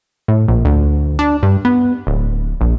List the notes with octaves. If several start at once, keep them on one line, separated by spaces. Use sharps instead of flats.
A2
A#1
D2
D4
G2
B3
D1
A#1